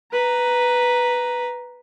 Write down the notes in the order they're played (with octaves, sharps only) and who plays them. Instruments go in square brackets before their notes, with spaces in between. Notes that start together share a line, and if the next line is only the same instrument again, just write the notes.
[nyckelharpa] B4 A#5